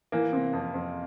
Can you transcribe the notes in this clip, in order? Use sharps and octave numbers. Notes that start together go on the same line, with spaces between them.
E3 A#3
C3
F2
F2